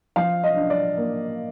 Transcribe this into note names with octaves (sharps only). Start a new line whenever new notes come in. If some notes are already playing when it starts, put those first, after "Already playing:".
F3 F5
D#5
D4
D5
A#3